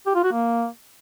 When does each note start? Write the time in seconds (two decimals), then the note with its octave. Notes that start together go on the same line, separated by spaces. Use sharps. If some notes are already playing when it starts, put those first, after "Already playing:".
0.06 G4
0.15 F4
0.23 F#4
0.32 A#3